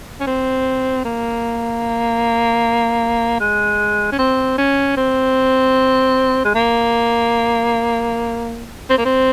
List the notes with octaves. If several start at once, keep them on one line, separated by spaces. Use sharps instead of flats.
C#4
C4
A#3
G#3
C#4
C4
C#4
C4
G#3
A#3
C4
A#3
C4